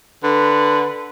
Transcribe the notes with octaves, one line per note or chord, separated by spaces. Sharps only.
D3 B4